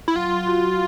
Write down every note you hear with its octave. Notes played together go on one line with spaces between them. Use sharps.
E4
F#3 F4
F#4